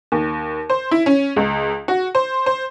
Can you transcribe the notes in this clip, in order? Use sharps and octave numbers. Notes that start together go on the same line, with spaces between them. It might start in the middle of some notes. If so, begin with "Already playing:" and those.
D#2
C5
E4
C#4
C#2
F#4
C5
C5